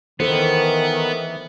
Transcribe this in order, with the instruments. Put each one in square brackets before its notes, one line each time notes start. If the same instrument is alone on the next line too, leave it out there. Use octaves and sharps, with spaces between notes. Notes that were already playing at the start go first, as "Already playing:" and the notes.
[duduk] D#3 [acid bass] E3 [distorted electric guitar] B3 [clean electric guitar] A4 C5